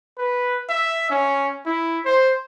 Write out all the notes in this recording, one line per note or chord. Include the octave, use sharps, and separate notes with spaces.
B4
E5
C#4
E4
C5